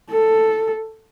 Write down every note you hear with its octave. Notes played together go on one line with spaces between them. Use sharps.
A4